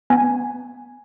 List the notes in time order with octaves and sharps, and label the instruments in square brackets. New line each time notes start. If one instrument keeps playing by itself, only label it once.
[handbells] B3 G#5